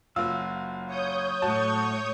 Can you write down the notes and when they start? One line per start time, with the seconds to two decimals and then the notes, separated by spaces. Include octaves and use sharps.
0.16 F#1 F#3 F4 E6
0.87 C#5 D#6 G6
1.42 A2 F#4 A5 C#6